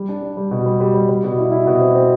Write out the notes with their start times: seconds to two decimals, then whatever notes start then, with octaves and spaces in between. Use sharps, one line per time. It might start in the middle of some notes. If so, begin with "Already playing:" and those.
Already playing: G3
0.09 D4
0.22 D4
0.37 G3
0.51 B2
0.66 G3
0.80 G3
0.94 G3
1.09 G3
1.24 B2
1.38 E4
1.52 E4
1.67 B2
1.80 C4
1.95 C4